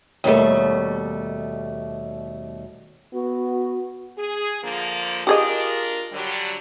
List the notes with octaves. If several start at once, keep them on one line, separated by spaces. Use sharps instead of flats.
D#2 B2 D3 G3 A3
B3 F#4
G#4
D3 F3 A#3
D4 F4 G4 G#4 A#4 D#5
D3 F#3 G3